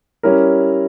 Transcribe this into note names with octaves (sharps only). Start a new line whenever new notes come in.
G3 C#4 E4 A#4